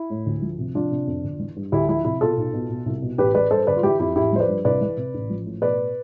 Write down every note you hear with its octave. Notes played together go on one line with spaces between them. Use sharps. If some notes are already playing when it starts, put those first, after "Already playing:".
Already playing: E4
A2
D2
F3
C3
F3 D4 F4
C3
F2
G1
E3
G2
D2 E4 G4
F3 E4
C3 E4
B2 F4 A4
B1
B2
B2
C2
B2
A1 G4 B4
E3 B4 D5
G2 A4 C5
G1 B4 D5
F4
E3 E4 G4
F2 E4 G4
A1 E4 G4
F3 C5
B4 D5
G2
C2 B4 D5
E3
C3
A1
F3
A2
B2 B4 D5